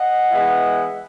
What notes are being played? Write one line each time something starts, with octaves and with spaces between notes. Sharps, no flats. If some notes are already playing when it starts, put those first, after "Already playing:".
Already playing: D#5 F#5
E3 G#3 B3 E4